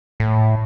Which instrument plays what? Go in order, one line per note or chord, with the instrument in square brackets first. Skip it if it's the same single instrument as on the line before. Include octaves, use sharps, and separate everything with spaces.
[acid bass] A2